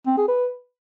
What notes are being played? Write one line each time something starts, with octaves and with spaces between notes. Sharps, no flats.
C4
G#4
B4